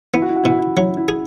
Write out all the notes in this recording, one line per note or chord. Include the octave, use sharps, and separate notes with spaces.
B3 E4
F#4
E4
F#4
B2 E4
F#4
E4
F#3 E4
E4
G#4